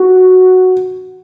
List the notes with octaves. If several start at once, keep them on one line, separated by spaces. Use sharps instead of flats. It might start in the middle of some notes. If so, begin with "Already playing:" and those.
Already playing: F#4